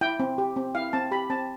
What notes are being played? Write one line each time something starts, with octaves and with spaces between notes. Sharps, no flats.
E4 G5
C4
G4
C4
E4 F5
C4 A5
G4 B5
C4 A5